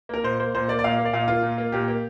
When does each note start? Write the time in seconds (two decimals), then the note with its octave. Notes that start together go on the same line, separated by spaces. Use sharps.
0.09 A#3 A#4
0.24 A#2 C5
0.40 A#3 C5
0.54 A#2 C5
0.68 A#3 D5
0.79 D5
0.84 A#2 F5
0.98 A#3
1.05 D5
1.13 A#2 F5
1.28 A#3 F4
1.43 A#2
1.58 A#3
1.72 A#2 G4
1.88 A#3